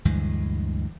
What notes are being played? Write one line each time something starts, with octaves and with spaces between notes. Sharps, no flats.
D2 G2 E3 G#3